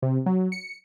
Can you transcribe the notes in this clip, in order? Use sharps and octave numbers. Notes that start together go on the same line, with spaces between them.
C3
F#3
C#7